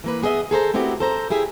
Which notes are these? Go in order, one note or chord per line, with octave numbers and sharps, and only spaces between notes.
E3 A#3 B4
B3 G#4 A#4 D#5 E5
G#4 A4 C5 A#5
A3 B3 C4 E4 F#4 G4
A4 C5 A#5
E4 G4 G#4 E5